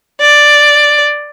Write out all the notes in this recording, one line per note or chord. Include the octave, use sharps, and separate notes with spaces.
D5